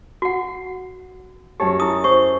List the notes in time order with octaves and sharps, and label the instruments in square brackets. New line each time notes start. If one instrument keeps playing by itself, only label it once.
[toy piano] F#4 F#5
[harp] F#2 C#5 A5 [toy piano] G4
[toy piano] E4 D#6
[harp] C5 [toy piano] C#6